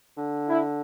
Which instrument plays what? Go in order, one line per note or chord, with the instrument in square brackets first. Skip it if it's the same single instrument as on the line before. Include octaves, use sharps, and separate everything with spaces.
[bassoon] D3
[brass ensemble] E4